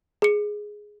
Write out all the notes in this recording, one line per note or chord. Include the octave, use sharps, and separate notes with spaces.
G#4 C#7